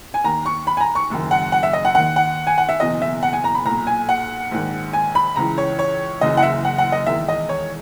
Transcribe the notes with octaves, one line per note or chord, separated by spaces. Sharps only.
G#5
D#2 D#3 A#5
C#6
B5
G#5
A#5
C#6
F#1 F#2 D#3
F#5
F#5
E5
D#5
F#5
D#2 D#3 F#5
F#5
G#5
F#5
E5
F#1 E2 B2 D#5
E5
F#5
G#5
A#5
B5
B1 A#2 A#5
G#5
F#5
A#1 G#2 D#3
G#5
B5
C#2 C#3 E3 A#5
C#5
C#5
F#1 F#2 C#3 E3 D#5
F#5
E5
F#5
F#5
D#5
E1 E2 D#3 E5
D#5
C#5